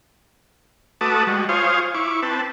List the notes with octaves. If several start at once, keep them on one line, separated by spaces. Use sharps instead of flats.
A3 F#4 B4 A5 D6 D#6
G3 G#3 F#4
F4 C5 C#5 F5 G#5 D#6
E4 C#6 D6
C4 B4 A5